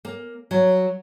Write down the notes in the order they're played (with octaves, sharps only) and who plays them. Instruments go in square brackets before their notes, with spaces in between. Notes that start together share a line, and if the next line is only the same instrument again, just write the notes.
[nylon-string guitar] A#3
F#3